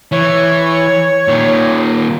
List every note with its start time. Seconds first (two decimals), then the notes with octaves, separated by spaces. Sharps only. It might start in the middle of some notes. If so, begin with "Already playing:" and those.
0.12 E3 C#5
1.28 A#2 D#3